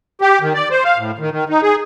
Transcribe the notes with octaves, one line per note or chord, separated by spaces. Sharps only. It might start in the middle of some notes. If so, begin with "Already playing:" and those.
G4
D#3
D5
C5
F5
A2
D#3
D#3
D#4
G#4